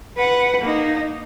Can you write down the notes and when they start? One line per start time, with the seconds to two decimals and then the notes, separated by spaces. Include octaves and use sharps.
0.17 B4 F#5
0.61 A#3 D#4